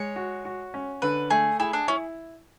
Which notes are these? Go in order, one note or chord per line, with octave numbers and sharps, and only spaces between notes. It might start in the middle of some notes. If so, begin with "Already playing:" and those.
Already playing: G#3 C#5
F#4
F#4
C#4
D3 B4
A3 G#4
E4 G#4
D4
C#4 E4